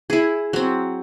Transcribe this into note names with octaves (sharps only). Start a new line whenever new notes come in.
E4 G#4
F#3 C4